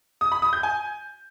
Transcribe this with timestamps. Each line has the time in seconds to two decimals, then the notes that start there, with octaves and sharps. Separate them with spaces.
0.21 D#6
0.32 B5
0.42 D#6
0.53 G6
0.63 G#5